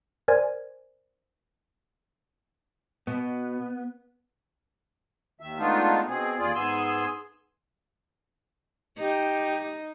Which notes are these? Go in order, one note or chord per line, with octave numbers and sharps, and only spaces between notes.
A#4 C5 D5 G#5 G#6
B2 B3
D#2 D#3 E5
G#3 A3 B3 D4 D#4 F4
B2 C4 G#4
D#2 F4 G#4 D5
G#2 B3 G#4 G#5 C6 E6
D#4 G4